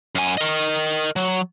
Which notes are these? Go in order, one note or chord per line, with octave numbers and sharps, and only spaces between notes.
F#2 G#5
A#4 D#5
F#3